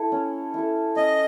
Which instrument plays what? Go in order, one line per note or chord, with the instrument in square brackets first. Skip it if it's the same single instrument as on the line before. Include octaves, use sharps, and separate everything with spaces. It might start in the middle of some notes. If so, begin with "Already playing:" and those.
Already playing: [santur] E4 A4
C#4
E4 A4
[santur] C#4 [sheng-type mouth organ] D#5